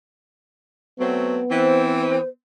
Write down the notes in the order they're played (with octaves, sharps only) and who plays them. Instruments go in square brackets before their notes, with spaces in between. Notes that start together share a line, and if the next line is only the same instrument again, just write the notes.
[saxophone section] F#3 A3 C4 [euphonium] B3
[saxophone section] E3 C4 [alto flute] C5